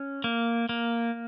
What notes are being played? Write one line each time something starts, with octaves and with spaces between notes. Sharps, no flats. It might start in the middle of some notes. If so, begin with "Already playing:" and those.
Already playing: C#4
A#3
A#3